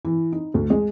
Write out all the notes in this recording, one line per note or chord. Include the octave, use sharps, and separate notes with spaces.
E3
D#4
D2
G#3